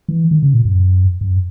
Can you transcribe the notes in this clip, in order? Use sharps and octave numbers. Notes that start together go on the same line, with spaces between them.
E3
D#3
C#3
A#2
F#2
F#2